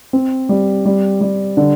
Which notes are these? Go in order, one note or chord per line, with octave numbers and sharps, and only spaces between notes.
C4
G3
G3
G3
D3